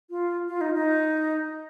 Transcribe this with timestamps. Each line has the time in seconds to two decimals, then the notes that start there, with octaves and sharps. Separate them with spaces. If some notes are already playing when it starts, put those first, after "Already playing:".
0.10 F4
0.49 F4
0.61 D#4
0.74 D#4